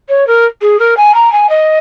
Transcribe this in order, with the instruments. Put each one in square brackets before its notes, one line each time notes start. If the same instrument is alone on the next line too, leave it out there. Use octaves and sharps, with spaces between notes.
[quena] C#5
A#4
G#4
A#4
G#5
A#5
G#5
D#5